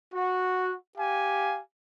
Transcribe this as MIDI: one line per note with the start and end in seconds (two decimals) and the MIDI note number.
0.12 0.75 66
0.98 1.60 67
0.98 1.60 77
0.98 1.60 80